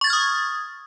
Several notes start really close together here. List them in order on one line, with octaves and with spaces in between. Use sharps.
C#6 A6 G#6 F6 D#6